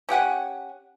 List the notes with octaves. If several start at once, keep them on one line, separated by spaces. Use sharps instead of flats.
C#4 G4 F#5 G#5